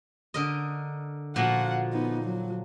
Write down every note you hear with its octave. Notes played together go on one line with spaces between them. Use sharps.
D3 A#4 D#5
A#2 F3 F#4 F5 F#5
B3 D#4
F#3